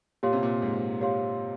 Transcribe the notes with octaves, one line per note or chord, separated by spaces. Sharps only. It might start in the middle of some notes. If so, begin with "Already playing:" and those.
A#2 G4 C#5 F5 C6
C3
A#2
G#2
G4 C#5 F5 C6